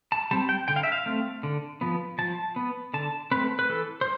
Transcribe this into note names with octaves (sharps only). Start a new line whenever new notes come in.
A5
G3 C4 A5
G5
D3 G5
F5
E5
F5
A3 C4
D3
F3 B3
F3 A5
B3
D3 A5
A3 C4 B4
B4
E3 A4
C5